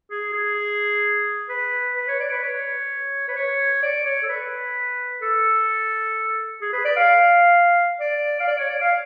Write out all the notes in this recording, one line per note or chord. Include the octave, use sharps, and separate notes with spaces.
G#4
G#4
B4
B4
C#5
D5
B4
C#5
B4
C#5
D5
C#5
A4
B4
A4
G#4
B4
D5
F5
D5
F5
D5
C#5
D5
F5